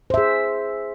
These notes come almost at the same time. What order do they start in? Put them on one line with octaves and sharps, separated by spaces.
C5 E5 G#4